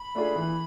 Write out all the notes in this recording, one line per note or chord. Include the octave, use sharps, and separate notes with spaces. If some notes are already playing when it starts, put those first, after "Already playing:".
Already playing: B5
A3 D4 F4 G#4
E3